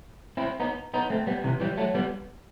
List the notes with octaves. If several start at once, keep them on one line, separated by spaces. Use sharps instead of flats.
C4 E4
B3 D#4
B3 D#4
A3 C4
G3 B3
C3 E3
E3 G3
F#3 A3
G3 B3